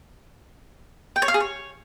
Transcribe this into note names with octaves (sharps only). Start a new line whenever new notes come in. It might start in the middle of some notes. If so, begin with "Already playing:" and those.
G5
C#5
F5
G#4
C#5